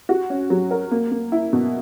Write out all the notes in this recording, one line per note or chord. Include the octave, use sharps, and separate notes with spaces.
F#4
C#4
F#3
A#4
A#3
A#3
E4
B2